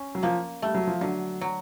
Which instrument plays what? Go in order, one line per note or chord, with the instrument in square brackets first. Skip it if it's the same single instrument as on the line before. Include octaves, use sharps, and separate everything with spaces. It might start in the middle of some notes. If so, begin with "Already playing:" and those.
Already playing: [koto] C#4
[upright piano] F#3
[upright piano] F3 [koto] A#3
[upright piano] G3 [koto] A3
[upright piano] F#3
F3
[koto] D3 [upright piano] F#3
[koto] F#3